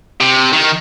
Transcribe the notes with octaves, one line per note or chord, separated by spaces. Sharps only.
C3
D#3